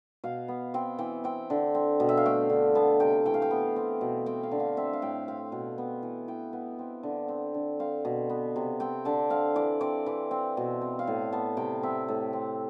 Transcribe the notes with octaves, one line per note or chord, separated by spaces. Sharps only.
B2 F5
B3
C4 G5
E3 G5
C4 G5
D3
C4
B2
E5
F5
A3 G5
D3
B3 A5
C3 G5
E3 G5
F5
G5
B3
C4
B2
C4 G5
F5
D3
F5
C4 E5
F5
A2 G5
C4 F5
B2
B3
E3
E3 G5
B3
C4
D3
C4
D3
C4 F5
B2
B3
C3
C4 G5
D3 A5
C4 F5
E3 D5
C4 D5
E3
C4
B2
C4
F5
A2
B3 A5
C3 G5
C4 E5
A2
C4